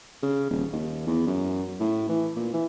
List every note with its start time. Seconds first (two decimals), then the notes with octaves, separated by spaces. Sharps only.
0.23 C#3
0.50 D#1
0.73 D#2
1.07 E2
1.27 F#2
1.80 A2
2.09 E3
2.36 A#2
2.54 E3